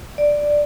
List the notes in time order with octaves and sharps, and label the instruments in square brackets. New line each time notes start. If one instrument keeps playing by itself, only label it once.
[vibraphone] D5